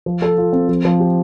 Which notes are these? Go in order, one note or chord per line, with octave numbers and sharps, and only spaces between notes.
F3
A4
F4
C4
F3
F3
G4